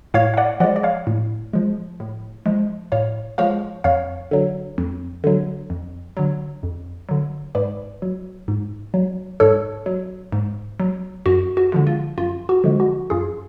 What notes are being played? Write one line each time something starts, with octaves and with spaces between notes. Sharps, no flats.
A2 C#5 F5
F5
D5 F#5
F3 G#3 D5 F#5
D5
C#5 F5
A2
F3 G#3
A2
F3 G#3
A2 C#5 F5
F3 G#3 C#5 F5
F2 C#5 F5
D3 F#3
F2
D3 F#3
F2
D3 F#3
F2
D3 F#3
G#2 B4 D5
F#3
G#2
F#3
G#2 A4 C#5
F#3
G#2
F#3
F#2 F#4
F#4
D3 F3 G#3
F4
F#2 F4
F#4
D3 F3 G#3
F#4
F#2 F4 G#4